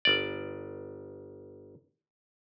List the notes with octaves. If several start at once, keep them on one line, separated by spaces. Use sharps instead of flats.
G1 D5